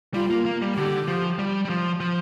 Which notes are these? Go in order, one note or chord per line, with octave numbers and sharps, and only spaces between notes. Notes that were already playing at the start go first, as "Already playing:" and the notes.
G3 F4
A#3
A#3
G3
D3 G4
F3
G3
G3
F3
F3